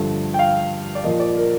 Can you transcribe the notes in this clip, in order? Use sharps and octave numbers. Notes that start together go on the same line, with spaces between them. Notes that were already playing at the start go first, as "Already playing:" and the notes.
Already playing: G2 D3 F3 A3
G5
F5
D5
A#1 A#2 F3 A#3 D#5
D5
A#4